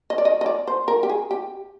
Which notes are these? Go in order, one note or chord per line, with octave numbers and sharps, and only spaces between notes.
D#5
D5
D#5
D#5
D5
C5
A#4
G4
G#4
G4